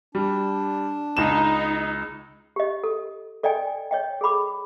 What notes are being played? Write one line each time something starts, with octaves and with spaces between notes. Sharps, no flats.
G3 D4
C#2 D#4 E7
G4 D#5
A4
A4 D5 D#5 G5 G#5
C#5 D#5 G5
G#4 A4 B5 D6